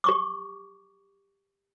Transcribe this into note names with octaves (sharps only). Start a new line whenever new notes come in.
G4 C#6 D6